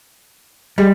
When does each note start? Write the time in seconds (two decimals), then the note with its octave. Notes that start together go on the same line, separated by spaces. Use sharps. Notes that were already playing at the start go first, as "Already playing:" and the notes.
0.78 G3 G#3